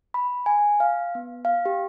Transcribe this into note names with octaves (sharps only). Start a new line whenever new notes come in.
B5
G#5
F5
B3
F5
G4